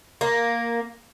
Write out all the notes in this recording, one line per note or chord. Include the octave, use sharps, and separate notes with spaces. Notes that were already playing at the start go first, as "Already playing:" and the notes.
A#3